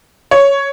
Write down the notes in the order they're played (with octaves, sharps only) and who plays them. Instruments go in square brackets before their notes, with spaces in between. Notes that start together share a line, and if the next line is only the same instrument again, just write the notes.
[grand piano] C#5